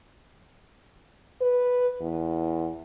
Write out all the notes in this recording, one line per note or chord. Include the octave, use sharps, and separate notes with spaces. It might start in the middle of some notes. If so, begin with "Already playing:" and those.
B4
E2